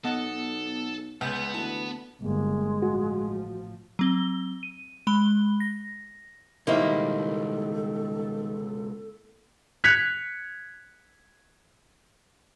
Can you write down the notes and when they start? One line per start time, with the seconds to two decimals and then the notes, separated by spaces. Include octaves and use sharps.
0.04 B1 B3 A4 D#5 F#5
1.21 C#2 B3 G6
1.54 D2 E3 A5
2.21 G1 G#3 A#3
2.82 A1 F3 F#4
3.99 F#3 C4 G7
4.63 D#7
5.07 G#3 B5 G7
5.60 A#6
6.67 C#2 B2 D#3 G3 A#3 E4 A4 C5
9.84 F#6 G#6 B6 C#7 F7